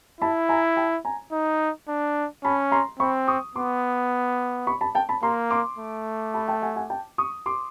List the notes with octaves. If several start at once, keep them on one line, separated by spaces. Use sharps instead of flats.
E4 A5 B5
G#5 A#5
G5 A5
G#5 A#5
D#4
D4
C#4 A5 B5
A#5 C6
C4 B5 C#6
C#6 D#6
B3 C6 D6
B5 C#6
A5 B5
G5 A5
A5 B5
A#3 A#5 C6
C6 D6
A3
A5 B5
G5 A5
F#5 G#5
F#5 G#5
G5 A5
C#6 D#6
C6 D6